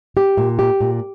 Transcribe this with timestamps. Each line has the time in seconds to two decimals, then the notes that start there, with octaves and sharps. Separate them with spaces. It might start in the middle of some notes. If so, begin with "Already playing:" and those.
0.17 G4
0.37 A#2
0.59 G4
0.80 A#2